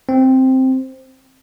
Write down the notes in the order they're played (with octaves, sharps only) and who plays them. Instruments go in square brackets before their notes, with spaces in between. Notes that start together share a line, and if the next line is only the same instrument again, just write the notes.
[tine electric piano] C4